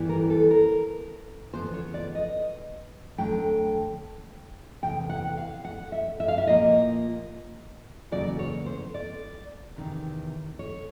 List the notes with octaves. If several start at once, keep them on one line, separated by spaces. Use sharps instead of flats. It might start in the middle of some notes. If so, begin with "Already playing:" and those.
Already playing: G2 E3 G3 B3
A#4
A4
A#4
E2 C#3 F3 B3 C5
C#5
D5
D#5
F2 D3 F#3 A3 G5
E2 C3 G5
F#5
F5
F#5
E5
E5
F5
E5
A#2 F3 A#3 D#5
E2 C#3 F#3 A#3 D5
C#5
C5
D5
E2 C3 D#3
C#5